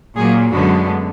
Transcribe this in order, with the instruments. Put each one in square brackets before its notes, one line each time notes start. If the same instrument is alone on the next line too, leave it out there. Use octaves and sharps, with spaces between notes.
[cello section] A#2 F#3 A#3 G#4
F#2 D3 G#3 B3 F#4